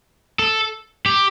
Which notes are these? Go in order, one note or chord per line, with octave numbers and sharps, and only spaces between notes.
A4
G4